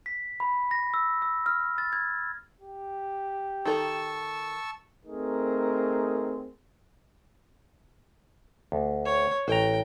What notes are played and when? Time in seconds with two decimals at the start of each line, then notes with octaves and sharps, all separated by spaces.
0.06 B6
0.40 B5
0.71 A#6
0.94 E6
1.22 E6
1.46 F6
1.78 A6
1.93 G#6
2.61 G4
3.65 D#3 A4 A5 A#5 C#6 E6
5.06 A3 C4 D#4 G#4 A#4
8.72 D2
9.05 C#5
9.48 A1 G5 A#5